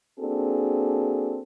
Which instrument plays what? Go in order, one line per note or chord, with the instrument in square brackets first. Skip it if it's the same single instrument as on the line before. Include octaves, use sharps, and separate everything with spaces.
[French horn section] A#3 C4 D4 F#4 G#4 A4